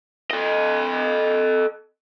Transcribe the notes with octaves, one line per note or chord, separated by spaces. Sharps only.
A4 D#5